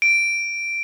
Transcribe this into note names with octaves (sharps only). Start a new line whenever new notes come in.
D7